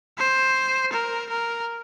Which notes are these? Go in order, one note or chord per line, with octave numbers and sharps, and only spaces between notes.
C5
A#4
A#4